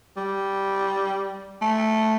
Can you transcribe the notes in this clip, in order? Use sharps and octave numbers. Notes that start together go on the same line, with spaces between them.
G3
A3